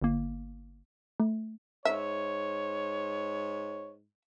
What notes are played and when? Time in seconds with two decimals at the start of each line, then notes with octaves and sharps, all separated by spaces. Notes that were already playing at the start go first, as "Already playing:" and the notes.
0.02 G1 A#3
1.20 A3
1.85 G#2 C#5 E5